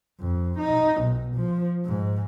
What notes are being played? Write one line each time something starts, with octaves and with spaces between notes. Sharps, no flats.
F2
D#4
B1
F3
G#2